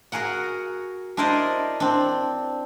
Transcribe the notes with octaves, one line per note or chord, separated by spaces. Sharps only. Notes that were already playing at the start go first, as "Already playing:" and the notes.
F#4 G#4 A#4 F#5
D4 E4 A#4 C5 D5 D#5
C4 D4